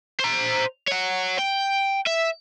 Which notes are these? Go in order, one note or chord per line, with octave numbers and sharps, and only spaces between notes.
C5 A#5
C#5 F#5
G5
E5